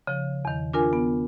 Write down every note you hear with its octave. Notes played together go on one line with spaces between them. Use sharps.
C#3 F3
E2 D#3
D4 F4 A#4 G#5
B3